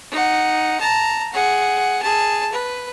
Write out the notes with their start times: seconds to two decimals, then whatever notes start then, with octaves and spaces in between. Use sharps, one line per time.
0.11 D#4 F#5
0.80 A5 A#5
1.32 G#4 F#5
2.02 G#4 A5
2.52 B4